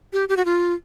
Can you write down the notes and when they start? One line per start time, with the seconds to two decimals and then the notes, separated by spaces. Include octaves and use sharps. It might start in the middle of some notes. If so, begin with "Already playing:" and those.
0.13 G4
0.29 G4
0.37 F#4
0.45 F4